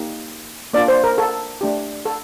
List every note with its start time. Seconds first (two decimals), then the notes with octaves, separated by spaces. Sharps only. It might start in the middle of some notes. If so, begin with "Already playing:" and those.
Already playing: A#3 D#4 G4
0.73 A#3 D4 F4 D5
0.88 C5
1.04 A#4
1.18 A4
1.61 A3 D4 G4
2.05 A4